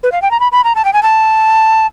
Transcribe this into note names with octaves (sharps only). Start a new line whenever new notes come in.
B4
F5
G5
A#5
B5
B5
A#5
A5
G5
G#5
A5